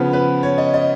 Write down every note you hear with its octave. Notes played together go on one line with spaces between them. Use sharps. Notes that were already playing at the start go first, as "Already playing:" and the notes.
Already playing: C#3 F3 B3
B4
C#5
D#5
D#5